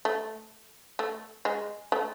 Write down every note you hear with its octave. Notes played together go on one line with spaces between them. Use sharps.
A3
A3
G#3
A3